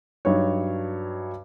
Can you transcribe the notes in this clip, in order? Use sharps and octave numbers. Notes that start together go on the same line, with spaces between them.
G2 F#3 D#4 C#5